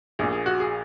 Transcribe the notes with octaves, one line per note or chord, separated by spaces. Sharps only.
A#1 A#2 G#4
G#4
F#4
G#4